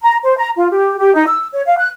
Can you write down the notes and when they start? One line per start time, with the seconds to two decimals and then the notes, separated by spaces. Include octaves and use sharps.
0.03 A#5
0.24 C5
0.37 A#5
0.57 F4
0.71 G4
0.98 G4
1.14 D#4
1.27 E6
1.53 C#5
1.66 F5
1.78 F#6